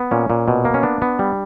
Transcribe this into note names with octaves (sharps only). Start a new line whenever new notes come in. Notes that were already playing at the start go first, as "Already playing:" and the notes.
Already playing: B3
A#2 C#4
A#2
B2
A#3
C#4
B3 D4
B3
G3